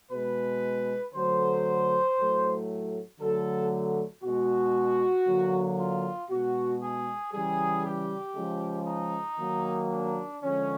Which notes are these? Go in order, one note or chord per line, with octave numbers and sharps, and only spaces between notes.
B2 G#3 B4
D3 F#3 A3 C5
A2 F#3 A3
D3 F#3 A3 A4
B2 G#3 F#4
D3 F#3 A#3
F4
B2 G#3 F#4
G#4
C#3 E3 G3 G#4
G4
C#3 F3 G#3
D#4
D#3 F#3 A#3
D4
D3 F3 G#3 C#4